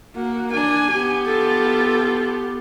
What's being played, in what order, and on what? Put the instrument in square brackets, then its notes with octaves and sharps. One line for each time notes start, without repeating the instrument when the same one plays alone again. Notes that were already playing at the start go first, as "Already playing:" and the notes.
[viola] A#3 [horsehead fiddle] F#4
[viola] D4 [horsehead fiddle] G#5
[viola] B3 G4
[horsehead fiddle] F4 A4